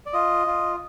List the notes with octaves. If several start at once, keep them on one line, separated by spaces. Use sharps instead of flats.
D5
F4 D#5
F4